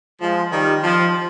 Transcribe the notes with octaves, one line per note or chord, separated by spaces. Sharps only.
F3 G#3
D#3 G3
F3